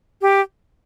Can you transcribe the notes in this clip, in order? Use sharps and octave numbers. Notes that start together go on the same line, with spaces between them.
G4